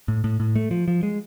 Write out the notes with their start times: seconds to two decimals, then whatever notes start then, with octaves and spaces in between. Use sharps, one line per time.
0.08 A2
0.24 A2
0.40 A2
0.56 A3
0.71 F3
0.88 F3
1.03 G#3